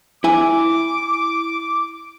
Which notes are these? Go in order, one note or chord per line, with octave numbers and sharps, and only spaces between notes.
E4 G#5 D6